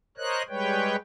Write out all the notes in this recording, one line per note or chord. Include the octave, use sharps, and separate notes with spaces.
A#4 C5 C#5 D#5 F#6
G3 G#3 B4 C#5 G5